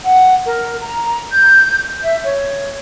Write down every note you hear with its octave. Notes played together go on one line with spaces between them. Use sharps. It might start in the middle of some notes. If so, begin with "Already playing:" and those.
F#5
A#4
A#5
G6
E5
C#5